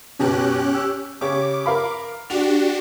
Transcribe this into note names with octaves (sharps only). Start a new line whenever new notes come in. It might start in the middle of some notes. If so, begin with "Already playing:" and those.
F#2 B2 C#4 G4 F#6
E6
C#3 G4 C#5 D6
A#4 F5 B5
D4 F#4 G4 F7